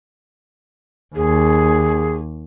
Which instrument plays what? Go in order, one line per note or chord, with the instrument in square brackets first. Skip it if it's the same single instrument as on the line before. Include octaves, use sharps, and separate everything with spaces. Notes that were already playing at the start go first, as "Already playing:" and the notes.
[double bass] D#2 [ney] G#4